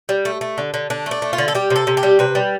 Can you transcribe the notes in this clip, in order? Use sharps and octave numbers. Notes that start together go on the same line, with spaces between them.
G3
A3
A3
D3
D3
D3 D4
A3
D4
A3
F4
D3
A4
G3 G4
C3
A4
C3
G4
G3
C3 B4
G3